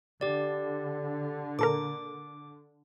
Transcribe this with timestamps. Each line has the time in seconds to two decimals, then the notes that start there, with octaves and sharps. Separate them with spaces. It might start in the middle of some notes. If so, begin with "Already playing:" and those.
0.21 D3 G4 D5
1.59 A#2 A4 A#4 D6